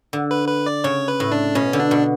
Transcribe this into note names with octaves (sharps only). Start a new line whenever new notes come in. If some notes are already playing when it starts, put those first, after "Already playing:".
D3
B4
B4
D5
C#3 C#5
B4
A2
D4
B2 C#4
D3
D4
B2